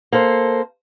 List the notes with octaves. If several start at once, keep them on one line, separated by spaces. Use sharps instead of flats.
A#3 A4 C5